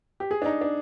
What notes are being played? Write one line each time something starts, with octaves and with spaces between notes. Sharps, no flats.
G4
G#4
D4
D#4
D4